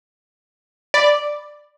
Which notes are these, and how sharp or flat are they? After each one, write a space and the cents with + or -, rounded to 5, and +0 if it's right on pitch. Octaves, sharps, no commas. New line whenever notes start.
D5 +0 B5 +0